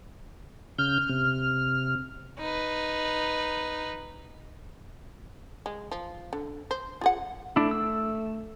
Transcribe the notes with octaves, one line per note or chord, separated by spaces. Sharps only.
C#3 F6 G6
C3
D#4 B4
G#3
F3
D3
C5
F4 G#4 F#5
A3 D4 E4
E6